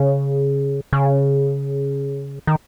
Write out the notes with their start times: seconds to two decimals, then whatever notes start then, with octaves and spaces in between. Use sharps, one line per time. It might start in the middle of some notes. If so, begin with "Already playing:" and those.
Already playing: C#3
0.93 C#3
2.47 D#3